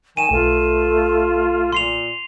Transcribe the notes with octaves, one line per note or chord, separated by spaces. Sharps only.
D#3 G#5 D#7 E7
B1 A3 F4
A#2 C6 C7 F7